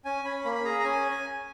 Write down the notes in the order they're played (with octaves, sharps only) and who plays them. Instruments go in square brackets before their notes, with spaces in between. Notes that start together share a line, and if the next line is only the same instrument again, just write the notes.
[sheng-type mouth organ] C#4 G#5
C#4 B5
A#3 B5
B5
G#4 A#5
A#5
C#4 G#5